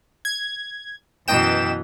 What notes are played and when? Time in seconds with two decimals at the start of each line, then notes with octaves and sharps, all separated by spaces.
0.25 G#6
1.28 F#2 B2 E3 D#5 G5 E7